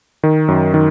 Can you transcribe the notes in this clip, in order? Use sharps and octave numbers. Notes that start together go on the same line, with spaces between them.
D#3
F#2
D#3